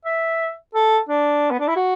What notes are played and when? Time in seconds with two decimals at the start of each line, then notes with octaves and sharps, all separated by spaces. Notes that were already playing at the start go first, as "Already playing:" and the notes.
0.05 E5
0.74 A4
1.08 D4
1.51 B3
1.59 D4
1.67 E4
1.76 F#4